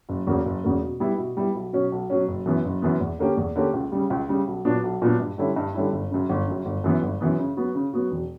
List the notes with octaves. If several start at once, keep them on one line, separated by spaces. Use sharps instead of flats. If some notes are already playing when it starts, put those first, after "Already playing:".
F#1
E2 C#3 F#3 A#3
F#1
E2 C#3 F#3 A#3
B2
G3 B3 E4
B2
G3 B3 E4
B1
B2 F#3 C#4
B1
B2 F#3 C#4
F#1
F#2 E3 B3
F#1
F#2 E3 B3
E2
D3 A#3 C#4 G4
E2
D3 A#3 C#4 G4
C#2
C#3 G3
C#2
C#3 G3
B1
A#2 F#3 B3 D4
B1
A#2 F#3 B3 D4
G2
D3 G3 C#4 E4
G2
D3 G3 C#4 E4
G1
F#2 C#3
G1
F#2 C#3
G1
F#2 E3 B3
G1
F#2 E3 B3
C#3
F#3 B3 F#4
C#3
F#3 B3 F#4
E1